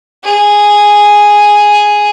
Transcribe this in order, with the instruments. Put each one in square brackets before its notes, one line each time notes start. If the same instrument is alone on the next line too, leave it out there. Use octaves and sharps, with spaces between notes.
[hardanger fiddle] G#4